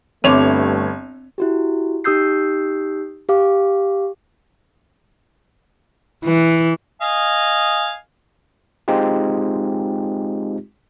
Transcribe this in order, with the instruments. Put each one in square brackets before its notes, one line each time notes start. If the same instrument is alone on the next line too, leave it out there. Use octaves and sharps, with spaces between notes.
[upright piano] G1 C#5 F7 [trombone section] G2 A3 [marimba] C4 D6
[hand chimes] E4 F#4 G4
D#4 G4 D#6 E6 G6 C7
G4 F5 D6
[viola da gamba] E3
[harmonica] D#5 F5 G#5
[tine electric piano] G#3 C4 D#4 F4 G4